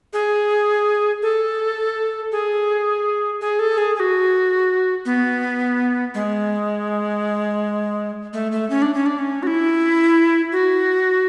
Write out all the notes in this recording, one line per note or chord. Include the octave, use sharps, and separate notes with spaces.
G#4
A4
G#4
G#4
A4
G#4
G#4
F#4
B3
G#3
A3
A3
C#4
D4
C#4
D4
C#4
F#4
E4
F#4